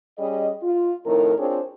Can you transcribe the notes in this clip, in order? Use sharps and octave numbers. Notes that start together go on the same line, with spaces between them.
G3 C#4 G#4 D#5
F4
F2 A2 D#3 A#4
C4 D4 F4 G#4 C5 C#5